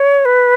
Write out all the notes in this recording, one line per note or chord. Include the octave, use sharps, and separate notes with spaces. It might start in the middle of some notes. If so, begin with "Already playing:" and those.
Already playing: C#5
B4